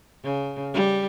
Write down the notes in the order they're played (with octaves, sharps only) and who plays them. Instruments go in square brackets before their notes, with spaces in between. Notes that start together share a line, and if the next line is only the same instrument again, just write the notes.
[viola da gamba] C#3
G3